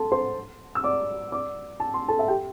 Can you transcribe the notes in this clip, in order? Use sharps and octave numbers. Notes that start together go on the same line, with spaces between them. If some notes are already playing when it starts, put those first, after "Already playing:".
Already playing: A4 A5 C6
C5 C6
E6
D5 D6
D5 D6
A5
C6
A4 A5
E5
G4 G5